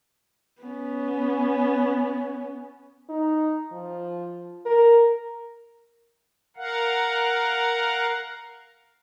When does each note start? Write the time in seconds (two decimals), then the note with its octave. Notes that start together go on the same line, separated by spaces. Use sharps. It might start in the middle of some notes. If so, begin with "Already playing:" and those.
0.62 B3 C#4
3.09 D#4
3.72 F3
4.66 A#4
6.57 A#4 F5 F#5